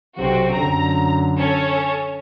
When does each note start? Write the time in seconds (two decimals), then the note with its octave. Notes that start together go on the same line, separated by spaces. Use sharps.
0.17 B1 C3 C4 F#4
0.53 F#2 D3 A#5
1.39 C#4 A4 C#5